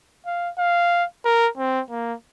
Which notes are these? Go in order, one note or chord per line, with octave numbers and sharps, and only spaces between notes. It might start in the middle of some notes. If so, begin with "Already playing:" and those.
F5
F5
A#4
C4
A#3